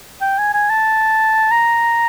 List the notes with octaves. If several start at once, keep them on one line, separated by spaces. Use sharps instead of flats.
G5
G#5
G#5
A5
A#5